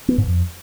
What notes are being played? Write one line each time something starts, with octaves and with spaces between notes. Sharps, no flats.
B3
G#2
F2